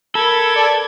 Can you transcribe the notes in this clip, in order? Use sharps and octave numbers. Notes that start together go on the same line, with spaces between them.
A4 A#4 B5 G#6
B4 D5 A5